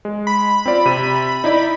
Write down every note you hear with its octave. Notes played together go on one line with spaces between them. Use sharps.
G#3
B5
C4 F4 D5
C3 D#7
D#4 E4 D5